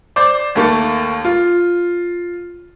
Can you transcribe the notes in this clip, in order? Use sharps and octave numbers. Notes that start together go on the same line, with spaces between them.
C5 D5 D6
D#2 A3 A#3 C#6 A6
F4